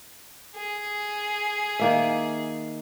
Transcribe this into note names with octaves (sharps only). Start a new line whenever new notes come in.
G#4
D#3 A#3 E5